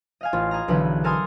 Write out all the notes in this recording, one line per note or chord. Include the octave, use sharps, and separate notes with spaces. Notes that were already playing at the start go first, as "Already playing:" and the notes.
D#5 F5 G#5
A1 F4
G#4 A#5
B1 D3 E3 B4 F#6
A4 A#4 G#5 C6 D#6